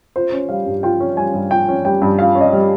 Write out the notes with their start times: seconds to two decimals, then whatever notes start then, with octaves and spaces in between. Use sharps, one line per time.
0.16 F4 C5
0.32 C#4
0.49 G3 F5
0.66 G2
0.83 F4 G5
1.00 C#4
1.17 G3 G#5
1.34 G2
1.51 F4 G5
1.68 C#4
1.85 G3 G5
2.02 G2
2.19 F4 F5
2.35 C#4
2.41 D#5
2.53 G3